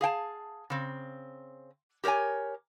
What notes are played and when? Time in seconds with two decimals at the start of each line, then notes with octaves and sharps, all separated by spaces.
0.01 G#4 F5 G5 A5
0.70 C#3 C4
2.04 G4 A#4 C5 C#5 G#5